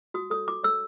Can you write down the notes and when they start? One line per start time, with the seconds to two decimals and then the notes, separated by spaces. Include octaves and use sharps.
0.14 F#4 D#6
0.30 A4 C#5 D#6
0.47 F#4 D6
0.64 A4 C#5 E6